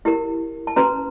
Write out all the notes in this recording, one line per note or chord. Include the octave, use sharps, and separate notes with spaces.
E4 G4 A#4
A5
C#4 F#4 B4 A#5